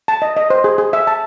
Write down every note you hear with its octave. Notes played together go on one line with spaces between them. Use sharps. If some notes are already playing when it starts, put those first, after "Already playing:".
A5
D#5
D#5
C5
G#4
G#4
E5
A5